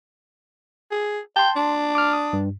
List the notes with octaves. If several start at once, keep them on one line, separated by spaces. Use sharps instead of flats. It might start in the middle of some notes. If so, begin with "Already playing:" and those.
G#4
G5 A5 C6
D4
D6 F6
D#6
G2